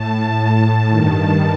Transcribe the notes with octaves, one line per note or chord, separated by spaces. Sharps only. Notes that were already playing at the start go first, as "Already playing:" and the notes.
Already playing: A2 A5
G2 D#3 A5